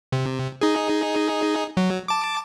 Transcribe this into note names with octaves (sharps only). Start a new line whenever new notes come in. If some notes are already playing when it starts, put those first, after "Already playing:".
C3
D#4 G#4
F#3
A5 D6